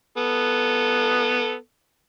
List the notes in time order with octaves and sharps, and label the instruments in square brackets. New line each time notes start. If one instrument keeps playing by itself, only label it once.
[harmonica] B3 A4